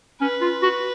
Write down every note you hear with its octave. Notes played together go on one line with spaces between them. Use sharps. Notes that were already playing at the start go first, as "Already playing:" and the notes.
C#4 B4
F4
F#4